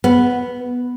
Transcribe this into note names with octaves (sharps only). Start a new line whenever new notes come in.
B3